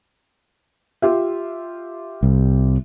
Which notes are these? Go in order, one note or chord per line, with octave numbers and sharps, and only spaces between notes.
F4 G4 E5
C2